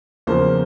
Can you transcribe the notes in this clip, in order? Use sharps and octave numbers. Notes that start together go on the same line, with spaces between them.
E2 C#3 F3 A#3 C5